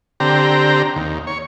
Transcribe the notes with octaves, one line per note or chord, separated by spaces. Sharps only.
D3 C4 G4 A#5
D#2
C#5